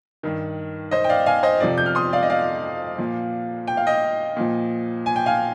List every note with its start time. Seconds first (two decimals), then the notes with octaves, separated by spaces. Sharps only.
0.23 G2 D#3
0.91 C5 D#5
1.04 G5
1.09 D5 F5
1.26 F5 G#5
1.43 C5 D#5
1.60 F2 C3 F3 D5
1.78 G6
1.86 F6
1.95 C6 D#6
2.13 D5 F5
2.22 D#5
2.30 D5 F5
2.98 A#2 F3
3.67 G5
3.77 F5
3.87 D#5 G5
4.36 A#2 F3
5.06 G#5
5.16 G5
5.26 F5 G#5